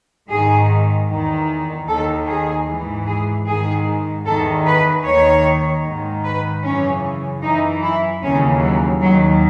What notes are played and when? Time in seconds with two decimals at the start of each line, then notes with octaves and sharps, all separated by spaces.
0.29 G#2 D#3 G#4
1.08 E2 D#3
1.87 D#2 D#3 A4
2.27 G#4
2.67 G#2 E3
3.07 G#4
3.46 G#2 D#3 G#4
4.25 E2 D#3 A4
4.66 B4
5.05 D#2 D#3 C#5
5.84 G#2 D#3
6.24 B4
6.63 F#2 C#3 E3 C#4
7.42 F#2 E3 D#4
7.82 E4
8.22 D#2 C#3 E3 C#4
8.61 F#3
9.01 D#2 D#3 F#3